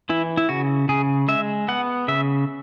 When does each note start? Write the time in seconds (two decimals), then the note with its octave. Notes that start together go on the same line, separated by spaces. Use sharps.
0.09 E3 E4
0.37 E4
0.49 C#3 F#4
0.89 C#3 G#4
1.28 G#3 E5
1.68 B3 F#5
2.08 C#3 E5